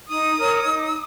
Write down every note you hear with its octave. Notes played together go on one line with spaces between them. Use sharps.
D#4 D#6
A#4 C#5
D#4